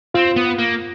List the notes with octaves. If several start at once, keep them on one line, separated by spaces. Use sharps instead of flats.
C4 F4
B3
A#3